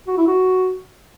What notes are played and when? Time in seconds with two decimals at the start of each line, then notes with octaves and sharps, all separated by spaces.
0.07 F#4
0.17 E4
0.27 F#4